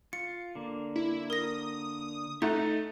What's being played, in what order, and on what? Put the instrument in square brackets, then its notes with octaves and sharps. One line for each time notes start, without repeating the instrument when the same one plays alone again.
[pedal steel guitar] F4 [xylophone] C#7
[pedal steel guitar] D3 A#3
[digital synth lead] E4
[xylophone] A#4 A#6 [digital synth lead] D#6
[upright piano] A3 [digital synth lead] D#4 [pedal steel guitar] E5 F#6 [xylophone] F#5 A#5